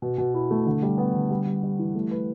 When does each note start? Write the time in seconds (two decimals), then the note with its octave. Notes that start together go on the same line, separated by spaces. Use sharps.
0.02 B2
0.18 B2
0.34 E4
0.51 A3
0.66 D3
0.82 G3
0.98 B3
1.14 D3
1.30 G3
1.47 G3
1.63 G3
1.79 E3
1.95 A3
2.11 B4